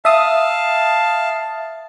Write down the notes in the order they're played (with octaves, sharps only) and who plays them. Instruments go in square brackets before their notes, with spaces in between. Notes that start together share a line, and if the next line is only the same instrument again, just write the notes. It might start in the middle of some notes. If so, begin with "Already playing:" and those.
[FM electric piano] E5 D#6 [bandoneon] F5 A5